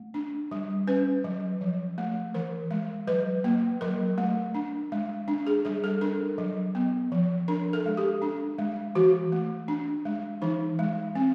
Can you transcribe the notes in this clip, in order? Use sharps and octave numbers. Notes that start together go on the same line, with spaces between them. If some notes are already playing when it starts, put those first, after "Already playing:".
Already playing: A3
D4
G3
C#4 B4
F#3
F3
A3
E3 A#4
G#3
F#3 B4
A#3
F#3 A#4
A3
D4
G#3
D4
G#4
G3 G#4
A4
D4 A#4
F#3
B3
F3
D4 A#4
A4
G#3
G4
D4
G#3
E3 F#4
A3
D4
G#3
E3 D#4
G#3
C4